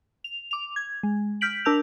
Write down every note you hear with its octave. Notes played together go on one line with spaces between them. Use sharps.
F7
D6 F7
G#6
G#3
F6 G6 B6 D7 F#7
D4 A#4 A5 E6 G6 F7